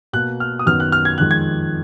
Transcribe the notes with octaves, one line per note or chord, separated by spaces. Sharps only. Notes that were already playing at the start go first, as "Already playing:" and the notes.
B2 A#3 F#6
F6
D#6
F#2 D#3 F#3 B3 F6
F#6
F6
G#6
F2 D#3 G#3 F#6
G#6